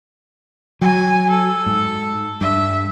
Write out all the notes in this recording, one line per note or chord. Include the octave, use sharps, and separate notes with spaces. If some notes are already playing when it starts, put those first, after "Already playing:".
F#3 G#5
A4
G#2
G2 E5